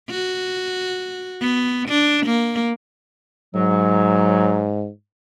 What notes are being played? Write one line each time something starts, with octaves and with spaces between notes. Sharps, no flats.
F#4
B3
D4
A#3
G#2 F#3